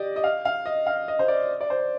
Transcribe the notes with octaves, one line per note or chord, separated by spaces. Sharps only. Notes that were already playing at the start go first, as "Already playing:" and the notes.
Already playing: G4 D5 D#5
D#5
F5
F5
D#5
F5
D#5
C5
D5
D5
C5